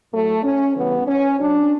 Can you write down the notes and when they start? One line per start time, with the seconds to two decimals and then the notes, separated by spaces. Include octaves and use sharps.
0.12 A2 F#3 A3
0.44 C#4
0.75 C#3 E3 G3 B3
1.06 C#4
1.38 B2 F#3 D4